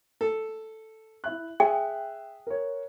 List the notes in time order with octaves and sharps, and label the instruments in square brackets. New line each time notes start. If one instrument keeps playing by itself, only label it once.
[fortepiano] A4
[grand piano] E4 E5 F#6
[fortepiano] G#4 [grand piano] E5 [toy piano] G5
[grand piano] A#4 C#5